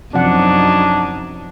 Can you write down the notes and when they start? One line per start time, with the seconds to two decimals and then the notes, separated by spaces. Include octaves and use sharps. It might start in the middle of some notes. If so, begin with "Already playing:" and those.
0.14 F#2 C3 F3 F#3 D4 D#4 F#5